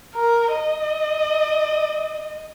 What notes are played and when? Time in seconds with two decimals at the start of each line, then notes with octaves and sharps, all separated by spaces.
0.14 A#4
0.52 D#5